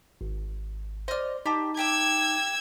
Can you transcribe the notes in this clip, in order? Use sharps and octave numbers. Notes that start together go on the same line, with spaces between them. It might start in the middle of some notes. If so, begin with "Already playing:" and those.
G#1
C5 D5 D#5 F6
D#4 G4 A5
G4 G5 D6 E6 G#6